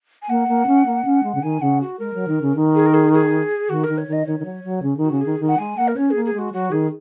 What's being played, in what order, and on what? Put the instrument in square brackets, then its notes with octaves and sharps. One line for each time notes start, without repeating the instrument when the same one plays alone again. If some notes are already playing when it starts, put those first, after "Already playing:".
[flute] G#5
[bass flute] A#3 [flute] F#5
[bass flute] A#3
C#4
A#3
C#4
G#3
C#3
[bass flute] D#3 [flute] G#5
[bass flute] C#3 [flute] F#5
[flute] F#4
[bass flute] G#3 [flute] A#4
[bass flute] F#3
D#3
C#3
D#3
[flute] G#4
A#4
G#4
G#4
[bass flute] D#3 [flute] F#4
[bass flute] D#3 [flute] A#4
[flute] C#5
[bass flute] D#3
[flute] D#5
[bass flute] D#3 [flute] C#5
[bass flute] D#3
F#3
F#3
C#3
[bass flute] D#3 [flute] F#4
[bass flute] C#3
[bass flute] D#3 [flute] G#4
[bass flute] D#3
[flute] F#5
[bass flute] G#3 [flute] G#5
[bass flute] A#3 [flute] F#5
[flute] A#4
[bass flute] C#4 [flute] C#5
[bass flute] A#3 [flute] G#4
[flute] G#4
[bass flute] G#3 [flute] F#4
[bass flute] F#3 [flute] F#4
[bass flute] D#3 [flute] G#4